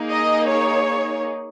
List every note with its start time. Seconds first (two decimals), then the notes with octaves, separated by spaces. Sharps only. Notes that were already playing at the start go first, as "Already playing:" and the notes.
Already playing: A#3 D#4 G#4
0.11 D#5
0.50 C#5